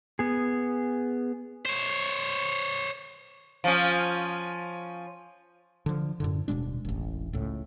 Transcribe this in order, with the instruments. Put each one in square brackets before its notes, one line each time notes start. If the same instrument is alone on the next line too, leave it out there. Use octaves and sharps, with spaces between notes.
[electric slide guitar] B3 G#4
[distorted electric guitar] C5 C#5
[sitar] F3 C#4
[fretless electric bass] D3 F3
F#2 A2 D3
D#1 B2 G#3 D4
E1 A1
C#2 A2